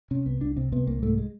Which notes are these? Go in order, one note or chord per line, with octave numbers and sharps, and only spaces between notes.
C3 C#4
C2 B3
C2 D4
C3 C4
C3 B3
C2 A#3
G#2 A3
G#3